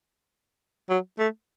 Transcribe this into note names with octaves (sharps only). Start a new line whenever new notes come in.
F#3
A3